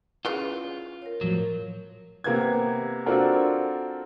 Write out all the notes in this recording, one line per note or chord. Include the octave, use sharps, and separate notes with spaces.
C#3 E3 G3 F4
A#4 C#5
A2 F3 F#3
C3 A#3 B3 G#6
C4 D4 F4 F#4 A4 A#4